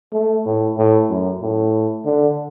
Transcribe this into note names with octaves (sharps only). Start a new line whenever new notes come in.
A3
A2
A2
F#2
A2
D3